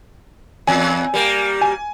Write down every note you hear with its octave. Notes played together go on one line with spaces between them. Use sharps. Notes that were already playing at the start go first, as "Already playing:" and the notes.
E2 G#5
G3 A#3
G#5